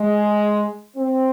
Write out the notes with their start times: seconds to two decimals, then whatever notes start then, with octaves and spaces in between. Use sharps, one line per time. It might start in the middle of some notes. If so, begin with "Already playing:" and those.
Already playing: G#3
0.97 C4